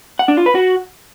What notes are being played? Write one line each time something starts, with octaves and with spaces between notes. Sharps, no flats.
F#5
D4
F4
B4
F#4